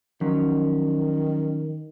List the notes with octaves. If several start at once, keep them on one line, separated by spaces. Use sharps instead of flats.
D#3 F3 F#3 C#4